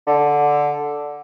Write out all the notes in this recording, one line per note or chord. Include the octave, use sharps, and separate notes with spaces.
D3